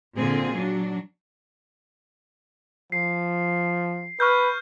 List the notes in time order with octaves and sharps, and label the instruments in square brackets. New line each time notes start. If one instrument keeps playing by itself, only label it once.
[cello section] A#2 D3 C4 F4 G#4
F#3 D4
[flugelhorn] F3 [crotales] C7
[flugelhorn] B4 [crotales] C#6 F6 G6